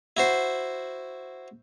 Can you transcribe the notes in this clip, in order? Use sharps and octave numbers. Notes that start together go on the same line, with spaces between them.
E4 F#4 C5